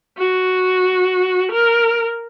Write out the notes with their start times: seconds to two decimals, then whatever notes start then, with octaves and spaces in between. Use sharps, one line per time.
0.18 F#4
1.51 A#4